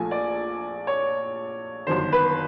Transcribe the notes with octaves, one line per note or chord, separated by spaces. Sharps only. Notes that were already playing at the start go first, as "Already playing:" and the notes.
Already playing: A#1 A#2 F3 A3 G#5
D5
C#5
G1 F#2 D#3 C5
B4